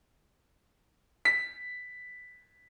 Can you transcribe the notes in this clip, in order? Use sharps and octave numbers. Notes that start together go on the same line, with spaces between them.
B6